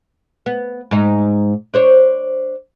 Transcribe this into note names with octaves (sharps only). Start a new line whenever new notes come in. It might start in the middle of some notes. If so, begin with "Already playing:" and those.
B3
G#2 D#4
D4 C5 C#5